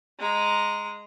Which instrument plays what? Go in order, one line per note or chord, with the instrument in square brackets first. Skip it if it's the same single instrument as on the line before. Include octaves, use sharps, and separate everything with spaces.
[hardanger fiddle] G#3 A#5